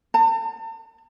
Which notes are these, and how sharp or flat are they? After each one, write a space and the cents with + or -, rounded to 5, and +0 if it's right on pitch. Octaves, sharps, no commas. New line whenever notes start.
A5 +40